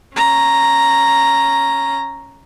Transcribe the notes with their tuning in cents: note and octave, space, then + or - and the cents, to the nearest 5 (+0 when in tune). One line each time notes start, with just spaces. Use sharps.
C#4 -10 A#5 +0